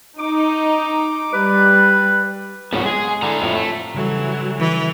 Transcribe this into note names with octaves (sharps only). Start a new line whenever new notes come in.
D#4 D6
G3 B4
G#1 C#2 G#2 B3 C#4 F#4
G#3 G#4
D3 E4 G#5 A#5
F2 A2
A3
C#3 E3 F#3 G3 A4
E3